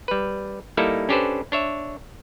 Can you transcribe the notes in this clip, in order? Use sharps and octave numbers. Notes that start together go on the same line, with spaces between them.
G3 B4
G3 A#3 D#4 E4 A4
C#4 D4 G4 A4 B4 C5
D4 C#5 E5